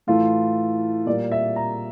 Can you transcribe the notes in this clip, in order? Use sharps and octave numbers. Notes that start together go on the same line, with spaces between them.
A2 E3 A3 F4
A#2 G3 A#3 D5
E5
A#5